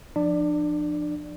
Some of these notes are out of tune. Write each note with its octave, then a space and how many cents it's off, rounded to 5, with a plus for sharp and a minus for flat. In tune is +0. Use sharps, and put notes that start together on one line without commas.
F3 +0 D4 +30 D5 +0